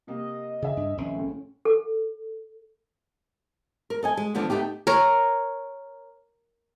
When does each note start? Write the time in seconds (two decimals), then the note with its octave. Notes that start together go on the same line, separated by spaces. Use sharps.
0.07 C3 A#3 G4 D#5
0.62 C#3 G#4 E5
0.77 G2 D4
0.98 A#1 D#3 C4 C#4
1.15 C#2 A2
1.65 A4
3.90 A#4
4.03 A4 D#5 G#5
4.17 G#3
4.35 E2 D3 F3 B3 D4
4.50 D2 A3 B3 D#4 G4
4.87 A#4 C#5